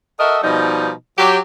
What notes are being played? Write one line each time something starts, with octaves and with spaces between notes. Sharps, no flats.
F#4 A4 A#4 D#5 E5
B2 F3 G3 D#4
F#3 G4